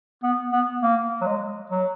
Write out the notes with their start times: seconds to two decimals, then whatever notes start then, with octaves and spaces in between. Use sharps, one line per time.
0.23 B3
0.52 B3
0.82 A#3
1.21 F#3
1.26 G#3
1.70 F#3